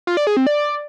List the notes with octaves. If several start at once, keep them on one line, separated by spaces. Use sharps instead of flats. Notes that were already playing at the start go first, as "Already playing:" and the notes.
F4
D5
G#4
C4
D5